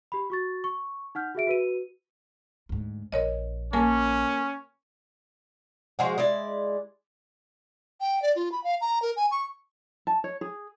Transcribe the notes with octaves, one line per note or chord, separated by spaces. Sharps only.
G4 B5
F#4 C#6 A6
C#6
D#4 F#5 F6 G6
F#4 G#4 E5 D7
F#4 B4 D#7
D2 G#2
A#1 A#4 C#5 D#5
A#3 C#4 A4 A#4 G#5 A5
F3 G#3 F#4
G#3 E4 D5
G5
D5
F4
B5
F5
A#5
A#4
G#5
C#6
A5
C#5
G#4